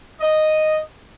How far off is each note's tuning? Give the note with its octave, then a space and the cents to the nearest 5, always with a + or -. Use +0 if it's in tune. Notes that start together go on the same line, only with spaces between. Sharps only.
D#5 -5